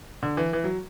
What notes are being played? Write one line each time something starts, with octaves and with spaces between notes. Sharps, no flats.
D3
E3
E3
F#3